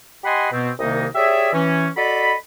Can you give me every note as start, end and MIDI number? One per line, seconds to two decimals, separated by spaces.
0.24 0.47 67
0.24 0.47 75
0.24 0.47 78
0.24 0.47 80
0.24 0.47 83
0.24 0.47 84
0.52 0.70 47
0.52 0.70 59
0.52 0.70 60
0.79 1.06 36
0.79 1.06 48
0.79 1.06 51
0.79 1.06 58
0.79 1.06 63
0.79 1.06 75
1.15 1.52 67
1.15 1.52 68
1.15 1.52 73
1.15 1.52 74
1.15 1.52 76
1.53 1.88 52
1.53 1.88 61
1.96 2.33 66
1.96 2.33 69
1.96 2.33 74
1.96 2.33 75
1.96 2.33 83